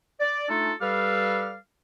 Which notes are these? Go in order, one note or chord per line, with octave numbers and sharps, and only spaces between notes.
D5
A3 D4 D#4 F4 A4
G3 G4 A4 B4 D5 F5